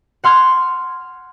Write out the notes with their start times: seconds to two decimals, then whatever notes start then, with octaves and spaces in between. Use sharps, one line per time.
0.24 F#5 C6 F6 G#6